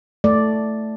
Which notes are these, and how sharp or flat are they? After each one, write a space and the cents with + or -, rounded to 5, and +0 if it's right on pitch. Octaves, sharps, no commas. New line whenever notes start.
A3 +0 D5 +0